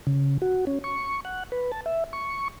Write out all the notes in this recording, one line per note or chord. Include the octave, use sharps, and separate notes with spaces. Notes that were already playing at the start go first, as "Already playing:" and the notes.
C#3
F#4
C#4
C#6
F#5
B4
A5
E5
C#6